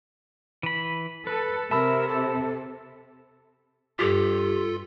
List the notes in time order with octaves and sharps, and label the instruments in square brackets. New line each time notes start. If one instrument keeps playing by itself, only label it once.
[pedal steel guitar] E3 B5
[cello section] A4 [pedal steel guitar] B4
[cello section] C3 [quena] A#4 [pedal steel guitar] E5 [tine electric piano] A5 B5 E6
[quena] A4
[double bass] G2 [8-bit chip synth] F4 A4 [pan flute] G4